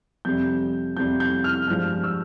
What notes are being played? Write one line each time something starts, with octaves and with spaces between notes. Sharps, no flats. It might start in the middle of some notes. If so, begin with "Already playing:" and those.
F2 C3 G3 G6
F2 C3 G3 G6
G6
F6
G2 F3 G#3 F6
E6